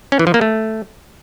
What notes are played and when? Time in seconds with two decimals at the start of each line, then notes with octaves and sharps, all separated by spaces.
0.12 C#4
0.19 E3
0.27 F3
0.34 A#3
0.41 A3